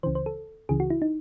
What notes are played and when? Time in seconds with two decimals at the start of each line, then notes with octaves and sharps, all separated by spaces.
0.03 C#2 C#3 E3 C5
0.15 C5
0.26 A4
0.69 C#2 C#3 E3 G#4
0.80 F#4
0.90 E4
1.02 D#4